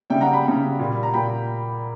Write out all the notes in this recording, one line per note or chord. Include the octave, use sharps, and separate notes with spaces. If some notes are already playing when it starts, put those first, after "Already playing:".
C#3 G3 E5 G5
F#5 A#5
G5 B5
C#3 G3
A#2 G3
A#5
A#2 G5 B5